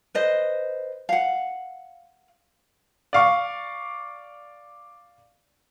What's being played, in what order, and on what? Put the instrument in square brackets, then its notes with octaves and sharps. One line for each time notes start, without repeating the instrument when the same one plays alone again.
[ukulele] B4 C5 D#5
F5 F#5
[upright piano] D5 F5 C#6